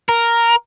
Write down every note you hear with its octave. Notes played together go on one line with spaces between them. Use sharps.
A#4